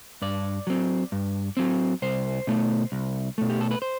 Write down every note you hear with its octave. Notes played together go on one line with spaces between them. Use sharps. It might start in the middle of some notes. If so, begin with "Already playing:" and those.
G2 D5
F#3 C4
G2
F#3 C4
C2 C5
B2 A3
C2
B2 A3
G4
A4
B4
C5